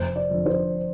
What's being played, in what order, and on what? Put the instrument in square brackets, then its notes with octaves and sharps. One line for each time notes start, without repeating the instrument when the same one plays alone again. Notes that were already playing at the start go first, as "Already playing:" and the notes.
Already playing: [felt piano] F1 C5
D5
F2 D3
C5